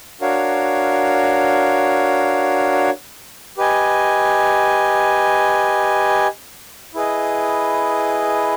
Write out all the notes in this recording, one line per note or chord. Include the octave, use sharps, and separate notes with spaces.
D4 F#4 A#4 C#5 F5
G4 B4 D#5 G#5
E4 G#4 B4 D#5